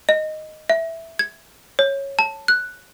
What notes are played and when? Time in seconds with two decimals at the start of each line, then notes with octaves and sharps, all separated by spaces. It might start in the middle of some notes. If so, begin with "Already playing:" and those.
0.09 D#5
0.69 E5
1.19 G#6
1.79 C#5
2.19 A5
2.48 F#6